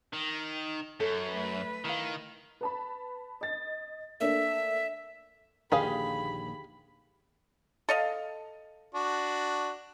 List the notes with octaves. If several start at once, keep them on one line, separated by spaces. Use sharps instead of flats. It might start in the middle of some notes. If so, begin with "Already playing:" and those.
D#3
F#2 A4
A3 B4
D#3 E4 F5
B4 A5 B5
D#5 A6
A3 A#3 D4 E5
A#1 D#2 D3 G4 G#4 F5 B5
A4 D#5 F5
D4 F#4